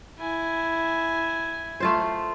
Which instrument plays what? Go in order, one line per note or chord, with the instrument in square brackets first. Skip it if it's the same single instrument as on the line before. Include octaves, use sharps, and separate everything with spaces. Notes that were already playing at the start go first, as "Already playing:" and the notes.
[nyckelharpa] E4 G#5
[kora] A3 F4 C5